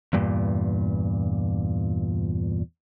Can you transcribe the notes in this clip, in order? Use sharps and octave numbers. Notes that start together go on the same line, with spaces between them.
E2 G2 A#2